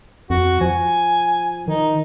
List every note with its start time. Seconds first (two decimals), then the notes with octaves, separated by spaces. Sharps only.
0.30 F2 F#4
0.61 F3 G#5
1.68 D#3 D#4